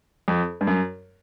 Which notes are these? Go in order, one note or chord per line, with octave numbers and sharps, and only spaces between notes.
F2
G2
F#2